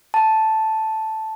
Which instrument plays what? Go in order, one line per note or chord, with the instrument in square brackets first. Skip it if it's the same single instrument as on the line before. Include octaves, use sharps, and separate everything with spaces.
[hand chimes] A5